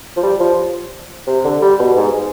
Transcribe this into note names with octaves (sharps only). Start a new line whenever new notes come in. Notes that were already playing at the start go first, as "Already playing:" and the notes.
F3
G3
F3
C3
D3
G3
B2
G#2